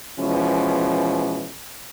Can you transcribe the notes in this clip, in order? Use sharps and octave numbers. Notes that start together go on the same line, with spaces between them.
B2 E3 F3 G#3 C#4